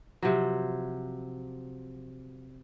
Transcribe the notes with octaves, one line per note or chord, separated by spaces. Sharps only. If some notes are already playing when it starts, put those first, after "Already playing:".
C3 F3 F#3